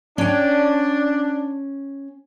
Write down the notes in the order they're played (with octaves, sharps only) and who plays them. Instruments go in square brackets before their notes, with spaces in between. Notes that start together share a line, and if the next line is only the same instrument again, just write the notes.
[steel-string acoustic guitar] C#4 G5 [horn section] D4